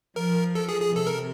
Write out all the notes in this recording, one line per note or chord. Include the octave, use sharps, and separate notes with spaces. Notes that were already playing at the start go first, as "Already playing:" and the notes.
F3 A#4
A4
G#4
G#4
C3 A4
A#4